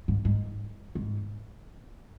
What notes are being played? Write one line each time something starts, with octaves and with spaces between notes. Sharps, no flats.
G#2
G#2
G#2